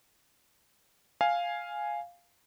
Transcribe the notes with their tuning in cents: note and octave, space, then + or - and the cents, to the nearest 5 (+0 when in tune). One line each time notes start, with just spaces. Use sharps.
F5 +0 G#5 +0